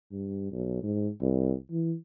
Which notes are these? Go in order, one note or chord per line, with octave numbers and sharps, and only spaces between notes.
G2
B1
G#2
C2
E3